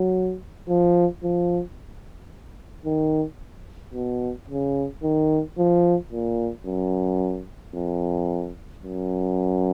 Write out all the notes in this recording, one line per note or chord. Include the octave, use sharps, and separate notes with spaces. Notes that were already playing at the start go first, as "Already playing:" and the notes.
Already playing: F#3
F3
F3
D#3
B2
C#3
D#3
F3
A#2
F#2
F2
F#2